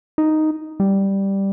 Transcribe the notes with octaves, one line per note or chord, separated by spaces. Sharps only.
D#4
G3